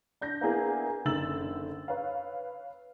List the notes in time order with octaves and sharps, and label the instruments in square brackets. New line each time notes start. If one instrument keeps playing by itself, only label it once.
[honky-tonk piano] D4 G6 A#6
A#3 B3 D4 E4 G#4 A#4
F#1 D3 D#3 E6 A6 F#7
B4 C#5 F5